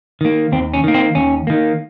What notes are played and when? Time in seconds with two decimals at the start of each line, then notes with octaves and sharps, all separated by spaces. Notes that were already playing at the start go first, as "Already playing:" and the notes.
0.21 D#3 A#3
0.52 D#2 C4
0.74 C#4
0.84 D#3 A#3
0.94 C4
1.15 D#2 C#4
1.47 D#3 A#3